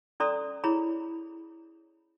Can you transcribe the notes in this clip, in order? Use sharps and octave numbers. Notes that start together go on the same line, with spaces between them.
C#4 A4 D5 A#5 C6 D#6
E4 G#4 C#5 A#5 B5